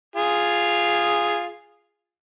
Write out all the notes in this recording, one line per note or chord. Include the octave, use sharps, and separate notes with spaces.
F4 G#4